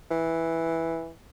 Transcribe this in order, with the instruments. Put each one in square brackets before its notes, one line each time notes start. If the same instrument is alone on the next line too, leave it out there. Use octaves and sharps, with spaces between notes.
[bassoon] E3